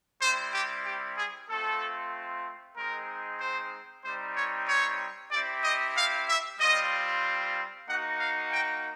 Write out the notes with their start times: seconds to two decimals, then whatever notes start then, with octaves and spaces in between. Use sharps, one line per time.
0.21 G3 C4 E4 C5
0.53 G4
0.86 G4
1.17 G#4
1.49 A3 C4 F4 A4
2.77 G#3 C4 D#4 A#4
3.40 C5
4.05 G3 C4 D#4 C5
4.36 C#5
4.68 C#5
5.32 C4 E4 G4 D5
5.64 D#5
5.96 F5
6.28 E5
6.60 G3 C4 F4 D#5
7.88 A#3 D#4 F#4 F#5
8.20 F5
8.52 G5